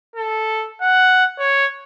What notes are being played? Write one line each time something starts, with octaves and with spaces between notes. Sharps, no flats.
A4
F#5
C#5